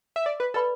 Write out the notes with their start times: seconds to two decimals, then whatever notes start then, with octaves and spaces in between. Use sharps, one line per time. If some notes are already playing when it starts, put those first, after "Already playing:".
0.16 E5
0.26 D5
0.40 B4
0.54 A4 B4 D5 B5